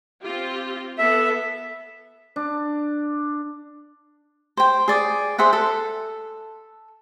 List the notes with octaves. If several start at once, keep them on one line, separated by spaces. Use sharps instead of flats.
C4 F4 G4
B3 A4 E5
D4
C5 G5
G#4 D5 D#6
G#4 C5 E5 F#5
A4